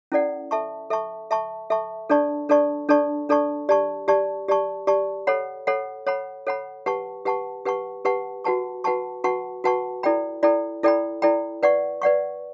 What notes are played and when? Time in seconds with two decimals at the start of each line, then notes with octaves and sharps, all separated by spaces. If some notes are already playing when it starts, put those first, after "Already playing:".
0.12 C#4 E4 A4 D5 F#5
0.51 A4 E5 A5 C#6
0.90 A4 E5 A5 C#6
1.31 A4 E5 A5 C#6
1.70 A4 E5 A5 C#6
2.10 D4 A4 D5 A5 C#6
2.49 D4 A4 D5 A5 C#6
2.89 D4 A4 D5 A5 C#6
3.29 D4 A4 D5 A5 C#6
3.69 G4 D5 A5 C#6
4.08 G4 D5 A5 C#6
4.48 G4 D5 A5 C#6
4.87 G4 D5 A5 C#6
5.27 A4 C#5 F#5 B5
5.67 A4 C#5 F#5 B5
6.07 A4 C#5 F#5 B5
6.47 A4 C#5 F#5 B5
6.86 G4 B4 F#5 A5 C#6
7.25 G4 B4 F#5 A5 C#6
7.65 G4 B4 F#5 A5 C#6
8.05 G4 B4 F#5 A5 C#6
8.44 F#4 B4 F#5 A5 C#6
8.84 F#4 B4 F#5 A5 C#6
9.24 F#4 B4 F#5 A5 C#6
9.64 F#4 B4 F#5 A5 C#6
10.03 E4 A4 D5 G5 B5
10.43 E4 A4 D5 G5 B5
10.83 E4 A4 D5 G5 B5
11.22 E4 A4 D5 G5 B5
11.63 B4 D5 F#5 C#6
12.02 B4 D5 F#5 C#6